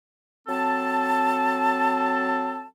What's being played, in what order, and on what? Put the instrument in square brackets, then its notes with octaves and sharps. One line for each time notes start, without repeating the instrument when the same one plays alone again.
[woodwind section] F#3 C4 A4 A5